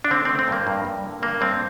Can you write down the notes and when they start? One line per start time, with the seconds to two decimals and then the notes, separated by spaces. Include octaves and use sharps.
0.04 D4
0.10 D3 C4
0.25 A3 C4
0.39 C4
0.48 G2 A#3
0.67 G2
0.85 G2
1.04 D3
1.22 G2 A#3
1.41 G2 C4